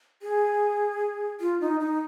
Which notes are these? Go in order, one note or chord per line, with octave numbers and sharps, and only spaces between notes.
G#4
F4
D#4
D#4